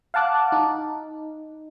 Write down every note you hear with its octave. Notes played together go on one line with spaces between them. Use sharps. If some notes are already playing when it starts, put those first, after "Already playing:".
F5 F#5 A5 D6 F#6
D#4